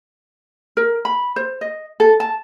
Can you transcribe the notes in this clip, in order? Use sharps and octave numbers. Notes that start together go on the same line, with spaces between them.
A#4
B5
C5
D#5
A4
A5